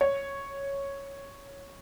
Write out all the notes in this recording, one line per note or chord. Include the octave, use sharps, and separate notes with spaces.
C#5